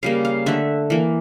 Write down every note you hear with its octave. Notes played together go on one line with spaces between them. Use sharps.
C#3 G3 A#3 F5
F5
D3 A3 E5
E3 A#3